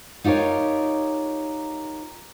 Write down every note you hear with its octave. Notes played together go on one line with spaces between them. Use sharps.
D#4 F4 G4 A#4 C#5